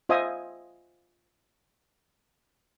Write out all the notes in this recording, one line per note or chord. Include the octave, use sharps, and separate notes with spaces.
F4 C5 D#5 E5 G#5 D#6